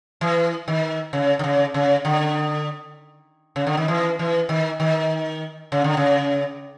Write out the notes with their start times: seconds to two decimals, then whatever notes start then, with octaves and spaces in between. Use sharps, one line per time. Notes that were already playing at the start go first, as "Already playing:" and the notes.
0.21 E3
0.68 D#3
1.13 C#3
1.39 D3
1.44 C#3
1.74 C#3
2.05 D3
3.56 C#3
3.67 D3
3.77 D#3
3.88 E3
4.19 E3
4.49 D#3
4.80 D#3
5.72 C#3
5.84 D3
5.97 C#3